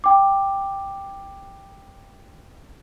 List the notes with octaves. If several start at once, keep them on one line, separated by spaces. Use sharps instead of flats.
G5 D6